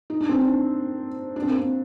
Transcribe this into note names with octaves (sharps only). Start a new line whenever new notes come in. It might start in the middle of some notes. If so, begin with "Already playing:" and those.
D#4
D4
C4
D4
D4
C4
A#3
C4